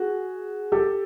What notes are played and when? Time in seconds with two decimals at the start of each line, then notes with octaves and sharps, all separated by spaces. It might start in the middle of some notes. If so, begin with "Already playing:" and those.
Already playing: F#4 G#4
0.72 G4 A4